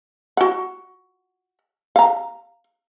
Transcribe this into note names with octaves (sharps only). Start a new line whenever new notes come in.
F#4 F#5
F5 A#5